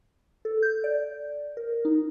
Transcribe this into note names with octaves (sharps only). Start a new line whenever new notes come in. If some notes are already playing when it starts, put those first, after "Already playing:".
A4
G6
D5
A#4
D#4